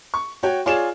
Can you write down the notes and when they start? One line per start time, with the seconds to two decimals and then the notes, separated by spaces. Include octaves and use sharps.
0.14 C#6
0.43 F#4 C#5 G5
0.66 F4 G#4 C#5 D5 E7